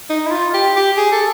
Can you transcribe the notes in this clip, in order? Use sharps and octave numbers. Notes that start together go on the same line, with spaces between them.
D#4
E4
F4
G4
G4
G#4
A4